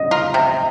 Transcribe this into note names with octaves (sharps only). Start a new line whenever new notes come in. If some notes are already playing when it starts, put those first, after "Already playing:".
Already playing: D#5
F4 A#4
C3